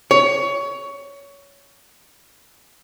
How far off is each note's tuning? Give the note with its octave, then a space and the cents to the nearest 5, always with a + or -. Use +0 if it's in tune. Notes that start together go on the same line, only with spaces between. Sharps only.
C#5 +20